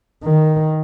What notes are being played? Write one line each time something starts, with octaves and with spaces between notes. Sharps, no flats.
D#3